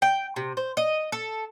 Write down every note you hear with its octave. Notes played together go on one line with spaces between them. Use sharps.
G5
C3
C5
D#5
A4